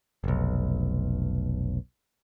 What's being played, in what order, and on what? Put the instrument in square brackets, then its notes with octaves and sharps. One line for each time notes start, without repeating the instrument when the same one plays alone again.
[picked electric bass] F1 B1